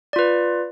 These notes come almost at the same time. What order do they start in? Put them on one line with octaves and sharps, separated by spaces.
D5 F4 B4